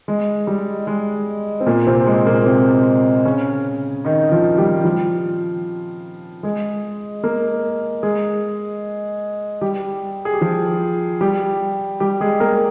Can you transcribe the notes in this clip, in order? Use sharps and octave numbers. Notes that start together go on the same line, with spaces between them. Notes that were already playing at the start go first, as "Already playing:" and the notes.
G#3
G3
G#3
C4
A#2 A#3
C3 C4
G#3
A#2 A#3
C3 C4
C#3 C#4
D#3 D#4
F3 F4
G3 G4
F3 F4
G#3 G#4
A#3 A#4
G#3 G#4
G3 G4
G#4
G4
F3 F4
G3 G4
G3 G4
G#3 G#4
A#3 A#4